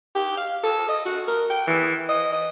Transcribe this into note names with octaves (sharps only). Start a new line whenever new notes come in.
G4
F5
A4
D#5
F#4
A#4
G5
E3
D#5
D#5